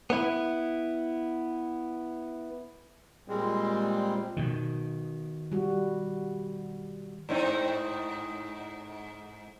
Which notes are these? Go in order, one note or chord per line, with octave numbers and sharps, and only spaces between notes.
B3 E4
A#2 G3 G#3 C4
B2 D#3
G3 F#4
G#2 C4 D#4